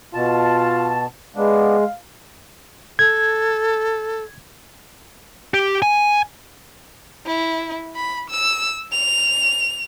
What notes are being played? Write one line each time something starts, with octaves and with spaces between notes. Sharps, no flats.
B2 F4 A5
G#3 B3 D4 F5
A4 G#6
G4
G#5
E4
B5
E6
F7